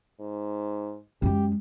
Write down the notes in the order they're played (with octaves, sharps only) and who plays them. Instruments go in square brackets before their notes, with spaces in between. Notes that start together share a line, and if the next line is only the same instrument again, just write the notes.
[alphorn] G#2
[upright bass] F#2 G#3 [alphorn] G4